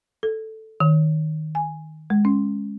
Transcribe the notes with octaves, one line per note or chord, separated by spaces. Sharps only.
A4
D#3
G#5
G#3
C#4